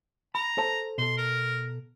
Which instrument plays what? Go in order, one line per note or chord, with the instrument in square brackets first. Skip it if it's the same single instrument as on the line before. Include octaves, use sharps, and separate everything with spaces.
[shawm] A#5 [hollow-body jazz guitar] B5
[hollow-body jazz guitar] A4 C5 A5
[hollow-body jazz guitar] B2 A4 [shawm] C6
[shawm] A#4